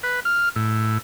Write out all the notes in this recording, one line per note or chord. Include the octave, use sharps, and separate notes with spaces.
B4
F6
A2